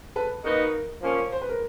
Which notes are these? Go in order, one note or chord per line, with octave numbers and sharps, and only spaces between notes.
A4 B4
A#3 D#4 F#4 A#4 B4 D#5
F3 A#3 C#4
C5
B4
A#4